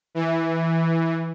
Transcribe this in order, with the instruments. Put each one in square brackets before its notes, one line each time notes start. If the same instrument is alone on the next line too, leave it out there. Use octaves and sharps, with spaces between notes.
[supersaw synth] E3